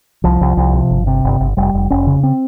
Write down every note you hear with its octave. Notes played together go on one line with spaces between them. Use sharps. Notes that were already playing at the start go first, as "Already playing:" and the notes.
C2 F3
C2
C2
C3
G1
C3
G1
G1
F1 G3
F1
F1 C#4
C#3
C4